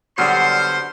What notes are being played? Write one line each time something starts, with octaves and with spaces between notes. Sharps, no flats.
D3 F#3 G3 B3 C5 C6 F6